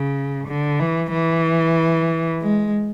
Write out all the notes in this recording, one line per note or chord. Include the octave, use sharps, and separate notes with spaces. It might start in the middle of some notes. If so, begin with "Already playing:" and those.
Already playing: C#3
D3
E3
E3
G#3